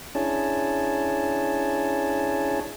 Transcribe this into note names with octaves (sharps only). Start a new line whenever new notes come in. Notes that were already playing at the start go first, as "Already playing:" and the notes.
C#4 D4 E4 G#4 C#5 A5